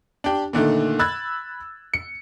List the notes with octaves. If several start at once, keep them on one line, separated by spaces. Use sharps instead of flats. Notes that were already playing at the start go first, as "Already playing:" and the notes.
D4 G4
A#2 D3 D#3 A3
B5 E6 F#6 G#6 A6
C#7